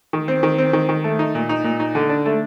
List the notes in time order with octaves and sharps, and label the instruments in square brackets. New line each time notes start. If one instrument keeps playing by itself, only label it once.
[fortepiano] D#3
C4
D#3
C4
D#3
D#3
A3
D#4
A#2
D#4
A#2
D#4
D3
D4
A3